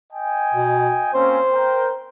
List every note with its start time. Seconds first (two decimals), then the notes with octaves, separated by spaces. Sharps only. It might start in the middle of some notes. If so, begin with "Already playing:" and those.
0.13 D#5 G5 G#5
0.54 B2
1.14 A#3 C4 C#4 C5
1.52 A#4 G5